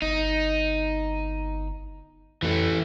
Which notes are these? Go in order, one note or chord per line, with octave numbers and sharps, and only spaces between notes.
G1 D#4
F2 E3 A3